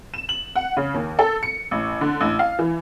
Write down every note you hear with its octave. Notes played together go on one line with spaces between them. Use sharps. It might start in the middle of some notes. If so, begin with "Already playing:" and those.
E7
F#7
F#5
C#3
D#2
A4
C#7
A1
D3
A1
F5
E3